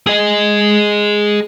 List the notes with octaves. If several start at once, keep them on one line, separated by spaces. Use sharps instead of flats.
G#4 D#5